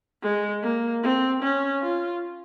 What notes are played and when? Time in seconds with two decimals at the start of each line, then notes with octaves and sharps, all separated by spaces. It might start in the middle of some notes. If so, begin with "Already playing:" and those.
0.23 G#3
0.63 A#3
1.03 C4
1.43 C#4
1.82 F4